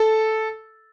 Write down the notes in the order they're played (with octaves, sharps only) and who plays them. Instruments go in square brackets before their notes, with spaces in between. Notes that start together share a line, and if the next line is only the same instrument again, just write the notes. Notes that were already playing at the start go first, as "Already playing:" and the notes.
Already playing: [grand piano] A4